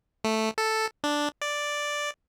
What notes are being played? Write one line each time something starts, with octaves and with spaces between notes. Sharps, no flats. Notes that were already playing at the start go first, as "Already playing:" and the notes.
A3
A4
D4
D5